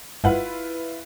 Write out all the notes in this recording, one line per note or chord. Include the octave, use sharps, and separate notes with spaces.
G1 E4 F4 B4 F#5